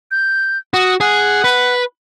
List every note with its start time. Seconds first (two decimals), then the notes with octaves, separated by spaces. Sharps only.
0.11 G6
0.74 F#4 D#6
1.01 G#4 F#5
1.44 B4